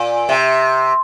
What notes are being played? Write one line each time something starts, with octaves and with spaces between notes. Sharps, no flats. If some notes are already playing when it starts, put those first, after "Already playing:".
Already playing: A#2
C3